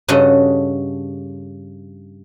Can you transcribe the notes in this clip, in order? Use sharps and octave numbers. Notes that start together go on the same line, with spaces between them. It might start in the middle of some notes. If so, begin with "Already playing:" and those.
G2 C#3 F#4 A4 D#5